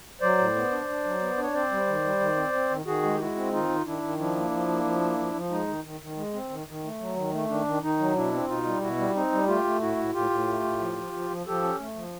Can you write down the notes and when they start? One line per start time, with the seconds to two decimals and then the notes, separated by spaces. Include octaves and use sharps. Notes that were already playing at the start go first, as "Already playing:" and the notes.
0.21 F#3 C5 D5
0.38 A2
0.55 B3
0.72 D4
0.88 D4
1.04 F#3
1.21 B3
1.37 D4
1.42 C#5
1.54 C4 C5 D5
1.71 G3
1.87 D#3
2.04 G3
2.20 D#3
2.36 C4
2.53 C4
2.70 D#3
2.86 D#3 F#4 G#4
3.03 G#3
3.15 G4
3.19 G#3 E4 F#4
3.35 C4
3.52 D#3 D#4 F4
3.69 D#3
3.85 D#3 D4 E4
4.02 D#3
4.18 F3 D4 E4
4.36 A#3
4.51 F3
4.68 A#3
4.85 F3
5.01 A#3
5.18 F3
5.34 F3
5.50 G#3 D#4
5.68 D#3
5.84 D#3
6.01 D#3
6.16 G#3
6.33 C4
6.50 D#3
6.67 D#3
6.84 A3
7.00 F#3
7.16 D#3
7.32 A3
7.49 D#3 D4
7.65 D#3
7.82 D#3 D#4
7.99 F#3
8.15 B2 D4 E4
8.33 C4
8.48 B2 D#4 F4
8.64 G3
8.81 B2 E4 F#4
8.98 G3
9.15 C4 D#4
9.32 G3
9.47 A3 F4 G4
9.64 A3
9.81 A2 E4 F#4
9.97 A2
10.13 A2 F4 G4
10.30 A2
10.48 A3
10.64 A2
10.80 F3
10.97 F3
11.13 F3
11.30 F3
11.46 F3 G4 A4
11.62 C#4
11.79 A3
11.95 F3